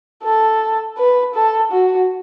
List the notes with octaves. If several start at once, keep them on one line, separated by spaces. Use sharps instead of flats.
A4
B4
A4
F#4